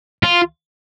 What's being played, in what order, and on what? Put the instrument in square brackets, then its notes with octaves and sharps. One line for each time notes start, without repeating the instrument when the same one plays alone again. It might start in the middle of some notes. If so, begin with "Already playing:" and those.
[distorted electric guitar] F4